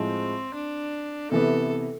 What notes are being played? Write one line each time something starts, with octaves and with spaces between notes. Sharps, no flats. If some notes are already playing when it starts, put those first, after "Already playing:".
Already playing: A2 F3 G#3 C4
D4
C3 E3 B3 A4